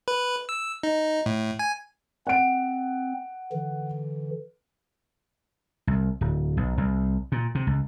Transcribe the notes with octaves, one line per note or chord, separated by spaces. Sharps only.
B4
E6
D#4
A2
G#5
C4 F#5 D7
D3 E3
C2
D1
B1
C2
A#2
C3
C#2